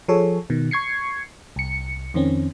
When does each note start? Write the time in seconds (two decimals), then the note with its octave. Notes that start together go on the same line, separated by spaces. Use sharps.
0.08 F3 G#4 A4 C#5
0.50 B2 D#3
0.71 C#6 G#6 C7 C#7
1.56 C2 C#7
2.14 F2 D#3 C4 C#4